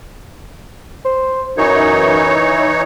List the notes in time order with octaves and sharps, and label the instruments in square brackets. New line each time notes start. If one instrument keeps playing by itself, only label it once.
[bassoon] C5
[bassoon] F#2 [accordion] E3 D#4 C#5